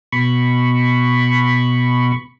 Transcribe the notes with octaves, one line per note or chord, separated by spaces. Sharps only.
B2 B5 C#6